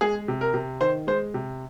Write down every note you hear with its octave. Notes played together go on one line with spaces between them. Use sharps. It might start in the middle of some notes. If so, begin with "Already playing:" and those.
G#3 G#4
C3
A#4
C3
D#3 C5
G#3 C5
C3